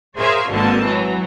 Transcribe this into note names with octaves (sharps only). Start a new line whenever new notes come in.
G#4 A#4 C5 C#5 E5 F5
G#1 B2 D3 A#3 C4 A5
E3 F#3